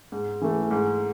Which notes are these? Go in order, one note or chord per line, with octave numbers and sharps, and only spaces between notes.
G#2
E3 A3
G#2